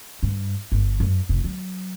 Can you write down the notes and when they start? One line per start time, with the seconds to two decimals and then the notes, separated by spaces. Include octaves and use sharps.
0.23 G2
0.72 G1
1.00 F#2
1.29 F1
1.44 F#3